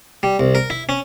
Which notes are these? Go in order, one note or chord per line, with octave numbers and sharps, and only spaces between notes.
G3
C2
A#4
E4
C#4